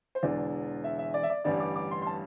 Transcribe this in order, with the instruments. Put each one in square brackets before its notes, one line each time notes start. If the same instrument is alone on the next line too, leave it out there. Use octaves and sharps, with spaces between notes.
[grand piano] C5
E1 E2 D3 D5
E5
E5
D5
E5
D5
A1 G2 D3 G3 D5
D6
D6
C6
C6
A5